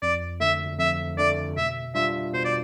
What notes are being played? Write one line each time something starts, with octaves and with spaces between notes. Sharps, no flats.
F2 D5
D3 A3 E5
F2 E5
D3 A3 D5
B2 E5
G3 D4 F4 E5
B2 C5
D5